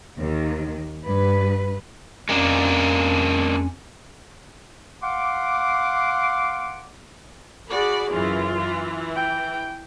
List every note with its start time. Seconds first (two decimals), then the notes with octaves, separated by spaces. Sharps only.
0.17 D#2 D#3
1.05 G2 B4
2.29 F2 G#3 A#3 C#4 D4
5.03 F5 F#5 C6 D6
7.71 F#4 G#4 D5 B5
8.11 F#2 C#3 E3 F4
8.56 E3
9.15 G5